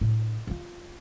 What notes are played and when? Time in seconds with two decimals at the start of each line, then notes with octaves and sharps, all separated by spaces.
0.01 A2 D4
0.47 G2 F4